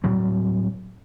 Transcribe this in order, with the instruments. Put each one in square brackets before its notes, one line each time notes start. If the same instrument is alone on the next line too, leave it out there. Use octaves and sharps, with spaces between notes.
[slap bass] A2 F#3 G3 C4